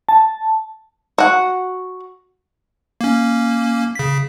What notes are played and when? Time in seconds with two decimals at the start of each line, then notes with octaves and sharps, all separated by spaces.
0.09 A5
1.18 F#4 F#5
3.01 A#3 C#4
3.95 C#3 B6